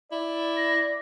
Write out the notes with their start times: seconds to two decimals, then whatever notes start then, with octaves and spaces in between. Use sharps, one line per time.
0.12 E4 D5
0.57 A#6